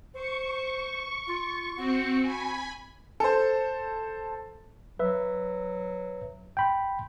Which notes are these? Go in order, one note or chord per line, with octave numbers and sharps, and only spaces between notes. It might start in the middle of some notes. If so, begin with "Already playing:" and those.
C5 C#6
F4
C4 F#4 C#7
G#5 B5
A4 C5
F#3 B4 E5
G5 B5 C6